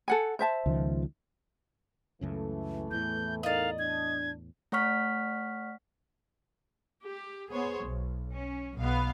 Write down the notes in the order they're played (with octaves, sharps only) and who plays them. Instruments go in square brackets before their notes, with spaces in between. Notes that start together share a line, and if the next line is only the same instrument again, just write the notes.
[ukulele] A4 F#5 G#5
C5 E5 A5
[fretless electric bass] C#2 D#3 F3
[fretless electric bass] C#2 F#2 C#3 [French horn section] E3 A3
[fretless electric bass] E2 A2 [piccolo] G6
[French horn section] D#4 A4 A#4 [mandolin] D5 D#5 [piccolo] F5
[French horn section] D4 [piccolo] G#6
[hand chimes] A3 C#5 F#5 C#6 F6 B6
[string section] G4
B3 G#4 C5 C#5
B1
C#4
B1 B2 B3 F5